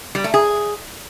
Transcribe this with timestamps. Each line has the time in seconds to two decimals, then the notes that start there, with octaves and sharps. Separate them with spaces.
0.15 G3
0.24 A3
0.34 G#4